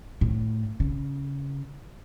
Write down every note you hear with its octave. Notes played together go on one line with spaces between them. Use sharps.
A2
C#3